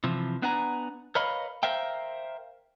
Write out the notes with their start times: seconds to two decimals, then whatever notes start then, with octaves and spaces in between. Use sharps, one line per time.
0.04 C3 E3 F3
0.42 B3 D4 B4 F#5 G#5 A#5
1.15 A#4 B4 C#5 D#5 F5 B5
1.63 A#4 C5 E5 F5 G5